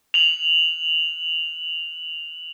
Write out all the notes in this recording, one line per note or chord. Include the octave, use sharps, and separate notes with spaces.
F7 F#7